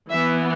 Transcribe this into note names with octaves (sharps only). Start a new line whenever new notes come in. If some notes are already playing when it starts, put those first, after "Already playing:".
E3 B3 E5